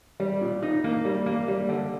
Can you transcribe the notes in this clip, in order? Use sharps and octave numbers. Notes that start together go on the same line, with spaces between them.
G3
A#2
D#4
A#3
G3
A#3
G3
D3